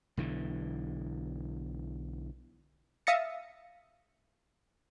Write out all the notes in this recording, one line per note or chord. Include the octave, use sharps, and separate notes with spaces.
B1 D3 E3
E5 F5 D#6 A6 A#6 C#7